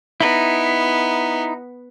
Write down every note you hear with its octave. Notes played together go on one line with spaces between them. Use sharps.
B3 D#4 E4